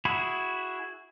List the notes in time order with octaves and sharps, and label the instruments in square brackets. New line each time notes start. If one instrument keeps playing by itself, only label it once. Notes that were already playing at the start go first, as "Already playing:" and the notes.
[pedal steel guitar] E4 F#4 G#4 B5